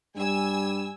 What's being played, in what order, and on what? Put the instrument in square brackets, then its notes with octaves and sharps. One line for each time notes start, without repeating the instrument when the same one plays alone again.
[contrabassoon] G2 [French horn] G3 [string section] G#5 E6